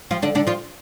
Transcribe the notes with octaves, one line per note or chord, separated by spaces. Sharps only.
F3 F4
D3 D4
D3 D4
F3 F4